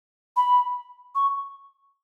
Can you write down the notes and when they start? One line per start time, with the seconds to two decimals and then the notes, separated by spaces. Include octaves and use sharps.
0.36 B5
1.15 C#6